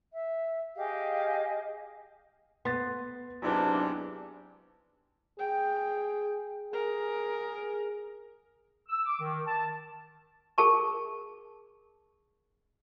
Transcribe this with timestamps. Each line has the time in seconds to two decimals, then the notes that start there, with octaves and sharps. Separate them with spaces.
0.12 E5
0.75 G4 G#4 D#5 F5
2.65 B3 C6 A6
3.42 G#2 C3 F#3 D4 E4 B4
5.39 G#4 G5
6.73 G#4 A#4
8.89 E6
9.06 D6
9.20 D#3
9.46 A5
10.58 G#4 A#4 A5 C#6